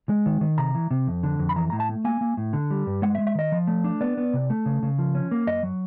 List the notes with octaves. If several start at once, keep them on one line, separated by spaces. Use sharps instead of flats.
G#3
D#3
D#3
C3 A#5
E3
C3
F2
D3
F2
B5
E3 A#5
A2 A#5
A5
A3
A#3 G#5
A#3
A2
D3
G3
G2
G#3 F#5
E5
G#3
E5
D#3 D#5
F3
A3
D4
B3 D5
B3
C3
A3
C#3
C#3
F3
C#4
A#3
F#2 D#5
F#3